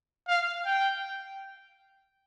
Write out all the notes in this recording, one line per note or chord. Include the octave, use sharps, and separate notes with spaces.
F5
G5